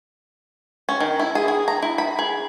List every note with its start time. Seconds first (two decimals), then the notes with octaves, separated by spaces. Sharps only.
0.89 C#4
1.00 D#3
1.19 E4
1.35 G#4
1.48 G#4
1.68 A#5
1.82 E4
1.98 B5
2.19 G#4